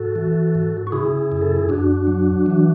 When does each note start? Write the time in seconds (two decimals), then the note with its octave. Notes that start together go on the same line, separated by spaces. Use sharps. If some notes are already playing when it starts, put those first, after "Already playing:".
Already playing: G#2 F#4 A4
0.16 E3
0.55 G#2
0.87 F#4
0.92 C#3 E4 G#4
1.32 F#2
1.42 A4
1.56 G#4
1.69 F#2 D4 F#4
2.07 F#3
2.46 E3